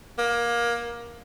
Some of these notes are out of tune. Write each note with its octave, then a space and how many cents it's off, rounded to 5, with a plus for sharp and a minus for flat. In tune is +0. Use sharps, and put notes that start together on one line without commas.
A#3 +20